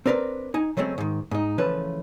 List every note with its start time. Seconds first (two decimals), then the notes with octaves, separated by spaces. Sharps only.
0.06 C4 D4 A#4 B4 D5
0.54 D#4 G#5
0.77 C#3 F#3 G#3 A3 C4 C#4
0.98 G#2 D#3
1.31 G#2 D#4
1.58 C#3 E3 F3 A3 C#4 B4